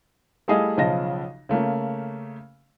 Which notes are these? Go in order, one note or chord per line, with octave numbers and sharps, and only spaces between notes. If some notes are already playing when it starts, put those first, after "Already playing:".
G3 A3 E4 G#4 D#5 F5
B1 C#3 F3 D#5 A5 A#6
C#3 A3 A#3 C#4